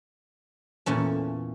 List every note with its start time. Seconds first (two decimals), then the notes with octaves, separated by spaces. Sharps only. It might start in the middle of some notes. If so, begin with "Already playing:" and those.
0.86 E2 A#2 C#4 A4